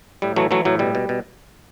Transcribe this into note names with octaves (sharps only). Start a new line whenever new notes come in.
A2 G3
E3 F#3 A3
E3 F#3 A3
A2 F#3
B2 G3
B2
B2